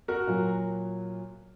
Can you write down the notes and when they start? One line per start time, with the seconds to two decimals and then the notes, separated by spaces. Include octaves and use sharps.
0.08 F#4 A#4
0.27 A#2 F#3